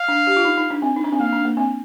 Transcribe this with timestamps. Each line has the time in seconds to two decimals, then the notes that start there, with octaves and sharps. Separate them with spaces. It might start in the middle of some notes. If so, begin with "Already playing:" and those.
Already playing: F5
0.08 D4
0.27 G4
0.36 F4
0.45 D#4
0.57 D#4
0.70 D4
0.82 C4
0.96 D#4
1.04 D4
1.12 C4
1.20 A#3 F5
1.32 D4
1.45 A#3
1.57 C4